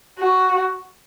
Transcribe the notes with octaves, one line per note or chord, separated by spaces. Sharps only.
F#4